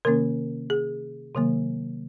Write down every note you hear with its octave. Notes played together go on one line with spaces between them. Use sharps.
C3 D#3 A#3 C#4 A#4
G#4
C3 D#3 F#3 A#3